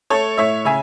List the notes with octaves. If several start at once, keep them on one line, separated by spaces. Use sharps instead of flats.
A3 A4 C#5
A2 C#5 E5
C#3 E5 G#5